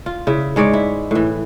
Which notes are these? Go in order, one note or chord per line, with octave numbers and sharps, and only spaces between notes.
F4
C#3 E4
G#2 G#3 C#5 D5
E4
A2 E3